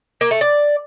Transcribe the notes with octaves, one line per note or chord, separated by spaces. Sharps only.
A#3
A3
D5